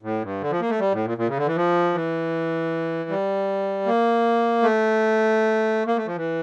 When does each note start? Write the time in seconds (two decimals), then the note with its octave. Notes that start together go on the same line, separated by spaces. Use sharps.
0.02 A2
0.22 G2
0.41 D3
0.51 F3
0.60 A#3
0.70 A3
0.79 G3
0.92 A2
1.05 A#2
1.18 A#2
1.28 C#3
1.37 D3
1.46 E3
1.56 F3
1.94 E3
3.09 G3
3.86 A#3
4.63 A3
5.87 A#3
5.96 A3
6.06 F3
6.16 E3